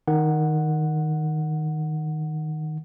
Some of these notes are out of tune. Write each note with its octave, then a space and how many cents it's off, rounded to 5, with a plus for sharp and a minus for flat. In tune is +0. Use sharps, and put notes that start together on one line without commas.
D#3 +0 F#5 +0